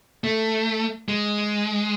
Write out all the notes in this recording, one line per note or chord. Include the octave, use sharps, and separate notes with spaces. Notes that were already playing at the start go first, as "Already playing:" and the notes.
A3
G#3